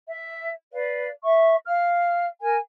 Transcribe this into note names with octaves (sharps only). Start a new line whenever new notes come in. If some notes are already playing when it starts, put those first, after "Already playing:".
E5
B4 D5 F5
E5 C#6
F5 F6
A#4 G#5